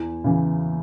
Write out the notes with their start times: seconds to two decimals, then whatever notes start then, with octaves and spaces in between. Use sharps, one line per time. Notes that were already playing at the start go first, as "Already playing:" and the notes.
Already playing: E2
0.24 C#3 E3